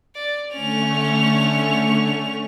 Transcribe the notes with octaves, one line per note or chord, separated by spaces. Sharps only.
D5
D3 A3 C#4 C#6 F7